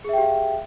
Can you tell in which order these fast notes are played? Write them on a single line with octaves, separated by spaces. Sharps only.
G#4 E5 G5 G4 F5